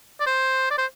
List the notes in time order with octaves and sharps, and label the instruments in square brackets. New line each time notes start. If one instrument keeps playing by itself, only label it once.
[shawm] D5
C5
D5
C5